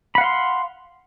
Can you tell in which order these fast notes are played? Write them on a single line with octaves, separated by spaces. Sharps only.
B5 F#5 F5 C6